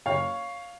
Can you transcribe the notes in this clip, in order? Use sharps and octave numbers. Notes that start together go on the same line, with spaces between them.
F#1 C#5 F5